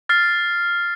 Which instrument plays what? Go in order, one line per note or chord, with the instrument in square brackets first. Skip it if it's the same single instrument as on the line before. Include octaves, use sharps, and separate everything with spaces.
[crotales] F6 A6 C7